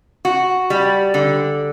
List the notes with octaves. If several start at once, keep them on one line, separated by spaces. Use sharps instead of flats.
F#4
G3
D3